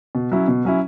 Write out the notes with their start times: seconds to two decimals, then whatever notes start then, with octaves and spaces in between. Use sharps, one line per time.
0.15 B2
0.32 F#3 C#4 E4
0.48 B2
0.65 F#3 C#4 E4